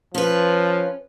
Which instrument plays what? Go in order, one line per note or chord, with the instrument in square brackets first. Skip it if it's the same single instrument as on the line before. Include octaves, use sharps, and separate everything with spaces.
[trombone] F3 [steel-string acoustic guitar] C#4 B4